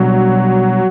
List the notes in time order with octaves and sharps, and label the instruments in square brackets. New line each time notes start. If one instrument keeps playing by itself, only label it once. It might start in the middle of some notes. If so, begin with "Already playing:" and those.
Already playing: [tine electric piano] B2 G3 B3 D4 [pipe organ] F#3